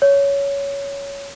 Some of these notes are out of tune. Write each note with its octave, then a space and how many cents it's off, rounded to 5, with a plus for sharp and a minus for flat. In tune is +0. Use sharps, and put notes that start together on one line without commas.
C#5 +15